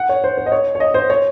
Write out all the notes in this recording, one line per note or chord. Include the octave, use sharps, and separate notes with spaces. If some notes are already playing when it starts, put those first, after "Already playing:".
Already playing: F#5
C#5
C5
C5
D#5
C#5
C#5
D#5
C5
C#5